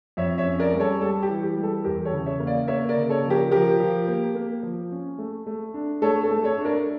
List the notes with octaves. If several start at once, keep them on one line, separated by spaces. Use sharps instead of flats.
F2 C#5 E5
C#5 E5
C#4
A#4 D5
G3
A4 C#5
G3 A4
G4
E3
G4
G3
A4
E2 G4 A#4
A4 C#5
C#3
C#5 E5
A#3
D5 F5
A#3 C#5 E5
A#4 D5
C#3
A4 C#5
F3
G4 A#4
F3 G4 A#4
F3
A#3
A#3
F3
C#4
A3
A3
D4
A3 A4 C#5
A4
A3
A4 C#5
D4
A#4 D5